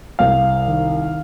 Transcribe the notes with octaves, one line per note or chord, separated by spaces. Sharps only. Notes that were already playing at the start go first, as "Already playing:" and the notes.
C2 F5
D#3